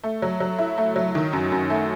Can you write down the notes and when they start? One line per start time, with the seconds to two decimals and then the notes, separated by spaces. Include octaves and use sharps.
0.04 A3
0.22 F#3
0.40 F#3
0.59 E4
0.78 A3
0.96 F#3
1.15 D#3
1.33 F#2
1.52 F#2
1.70 A3